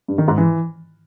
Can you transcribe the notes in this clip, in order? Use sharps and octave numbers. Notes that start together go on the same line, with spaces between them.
G2
D#3
G#2
E3